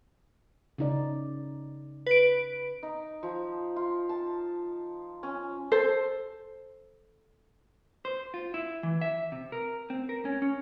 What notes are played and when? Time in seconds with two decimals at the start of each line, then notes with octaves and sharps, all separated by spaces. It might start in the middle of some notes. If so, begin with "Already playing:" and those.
0.78 C#3 D#4 D5
2.07 B4 D7
2.83 D#4
3.23 F3
3.76 F4
4.09 A5
5.23 C#4
5.72 A4 C5
8.05 C5
8.34 F4
8.54 E4
8.83 E3
9.01 E5
9.32 C3
9.52 A#4
9.90 C4
10.09 A#4
10.25 C#4
10.42 C#4